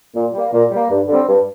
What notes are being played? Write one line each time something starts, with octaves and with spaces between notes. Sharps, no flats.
A#2
G3 A#3
A#2
G3 A#3
G2
D3 G3 C4
G2